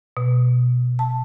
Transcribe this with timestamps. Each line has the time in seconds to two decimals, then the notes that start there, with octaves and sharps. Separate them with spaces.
0.17 B2
0.99 A5